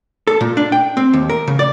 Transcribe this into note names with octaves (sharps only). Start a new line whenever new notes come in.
A4
A#2
D4
G5
C4
D#2
A#4
C#3
D5